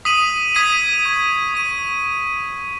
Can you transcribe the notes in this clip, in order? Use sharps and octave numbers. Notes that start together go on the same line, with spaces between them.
D#6 B6 D#7 F#7
D#6 G#6 B6 D#7
C#6 G#6 D#7
C#6 B6 D#7